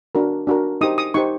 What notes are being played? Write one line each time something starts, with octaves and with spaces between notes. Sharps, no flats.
D4 F#4 A#4
D4 F#4 A#4
D#4 G4 C5 D#6
D#6
D#4 G4 C5 C#6